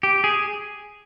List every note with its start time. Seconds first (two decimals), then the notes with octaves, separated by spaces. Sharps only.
0.03 G4
0.24 G#4